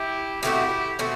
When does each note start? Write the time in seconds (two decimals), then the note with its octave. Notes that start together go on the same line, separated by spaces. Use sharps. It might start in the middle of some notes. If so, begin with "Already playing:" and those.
Already playing: E4 G4
0.43 B2 A3 C4 E4 F#4 G4
0.99 B2 A3 C4 F#4